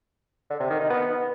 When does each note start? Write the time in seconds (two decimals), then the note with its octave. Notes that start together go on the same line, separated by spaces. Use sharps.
0.50 D3
0.60 C3
0.70 D#3
0.80 D#4
0.90 B3